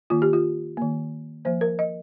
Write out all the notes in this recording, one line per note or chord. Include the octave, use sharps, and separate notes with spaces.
D#3 A#3 F4
G4
F4
D#3 A#3
F3 A#3 C5
A#4
D#5